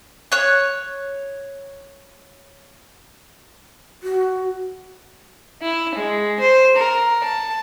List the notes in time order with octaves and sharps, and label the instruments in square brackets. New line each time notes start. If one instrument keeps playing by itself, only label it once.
[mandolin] C#5 F#6
[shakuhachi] F#4
[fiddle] E4
G#3
C5
A#4
A5